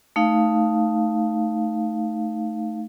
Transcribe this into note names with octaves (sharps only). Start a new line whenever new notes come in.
A3 D#4 F5